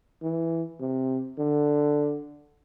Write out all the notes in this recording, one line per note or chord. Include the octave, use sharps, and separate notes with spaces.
E3
C3
D3